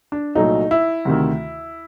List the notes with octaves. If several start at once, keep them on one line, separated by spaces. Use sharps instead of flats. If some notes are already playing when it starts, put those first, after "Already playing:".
D4
C2 A#2 F#3 A3 D#4
E4
D2 C3 D#3